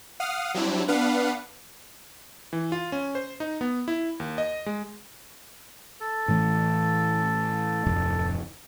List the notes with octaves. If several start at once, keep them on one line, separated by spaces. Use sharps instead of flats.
F5 F#5 D#6 F6
F#3 G3 C4 D4 E4
B3 D4 B4 F5 F#5
E3
F4
C#4
C5
D#4
B3
E4
D#2
D#5
G#3
A4
A2 E3 A3
D1 F2 C3